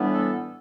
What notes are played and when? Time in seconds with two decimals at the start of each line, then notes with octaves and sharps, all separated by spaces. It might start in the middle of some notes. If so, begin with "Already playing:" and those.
Already playing: A2 E3 G3 B3 D4
0.14 A4